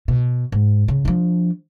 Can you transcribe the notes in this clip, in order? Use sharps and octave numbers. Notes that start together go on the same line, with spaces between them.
B2
G#2
C#3
F3 D4